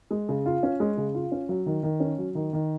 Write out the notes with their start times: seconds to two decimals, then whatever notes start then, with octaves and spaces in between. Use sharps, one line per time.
0.11 G#3
0.29 C#3
0.46 F4
0.63 C#4
0.80 G#3
0.97 C#3
1.15 F4
1.32 C#4
1.49 F#3
1.66 D#3
1.83 D#3
2.00 C#4
2.18 F#3
2.35 D#3
2.53 D#3